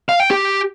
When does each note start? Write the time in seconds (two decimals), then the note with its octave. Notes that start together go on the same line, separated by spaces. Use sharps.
0.09 F5
0.20 G5
0.31 G4